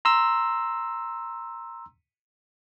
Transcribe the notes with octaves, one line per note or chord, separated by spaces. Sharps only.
A#5 C6 E6